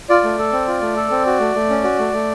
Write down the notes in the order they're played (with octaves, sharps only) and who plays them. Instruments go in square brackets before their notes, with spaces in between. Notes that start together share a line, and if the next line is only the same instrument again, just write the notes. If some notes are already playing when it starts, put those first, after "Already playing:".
[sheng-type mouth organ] F4 D5
A3
A4
C4
F4
A3
A4
C4
F#4
A3
A3
C#4
F#4
A3
A3